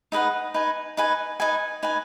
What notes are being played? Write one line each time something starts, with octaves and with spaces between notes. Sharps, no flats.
D#4 G#4 B4 F#5
D#4 B4 G#5
D#4 B4 G#5
D#4 B4 G#5
D#4 B4 G#5